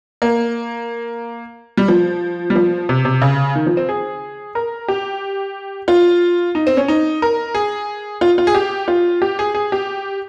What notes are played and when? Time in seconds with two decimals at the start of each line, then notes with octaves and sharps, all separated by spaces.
0.22 A#3
1.77 G3
1.88 F3
2.50 G3
2.55 F3
2.89 C3
3.05 C3
3.22 C#3
3.55 D#3
3.66 F3
3.77 C4
3.89 G#4
4.55 A#4
4.88 G4
5.88 F4
6.55 D#4
6.67 C4
6.77 C#4
6.88 D#4
7.22 A#4
7.55 G#4
8.21 F4
8.38 F4
8.47 G#4
8.55 G4
8.88 F4
9.22 G4
9.39 G#4
9.55 G#4
9.72 G4